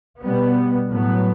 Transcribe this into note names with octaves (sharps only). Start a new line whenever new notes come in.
B2 G3 B3
A2 F#3 B3